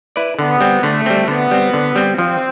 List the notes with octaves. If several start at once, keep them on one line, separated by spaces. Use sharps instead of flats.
E4 B4 D5
D3 B3
G3 C4
D3 A3
G3 C4
D3 B3
G3 C4
D3
G3 C4
F3 C4